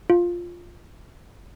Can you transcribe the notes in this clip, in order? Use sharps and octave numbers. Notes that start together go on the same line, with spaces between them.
F4